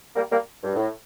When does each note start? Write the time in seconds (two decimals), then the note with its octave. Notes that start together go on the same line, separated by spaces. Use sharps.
0.14 G3 A#3
0.31 G3 A#3
0.64 G2
0.75 A2